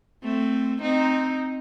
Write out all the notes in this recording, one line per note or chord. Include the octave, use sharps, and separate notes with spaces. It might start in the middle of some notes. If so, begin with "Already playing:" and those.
A3 C4
C4 D#4